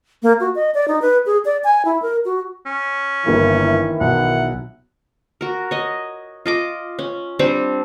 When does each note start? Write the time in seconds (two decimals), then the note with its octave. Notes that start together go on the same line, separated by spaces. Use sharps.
0.23 A#3
0.40 F#4
0.55 D#5
0.74 D5
0.88 D#4
1.02 B4
1.26 G#4
1.45 D5
1.64 G#5
1.85 E4
2.02 A#4
2.25 F#4
2.66 C#4
3.26 G1 D#3 E3 A#3 E4
4.01 B1 F#5
5.41 F#4 A#4
5.71 C#5 D#5
6.46 F4 D#5 D6
6.99 C#4
7.39 G3 C4 D4 C5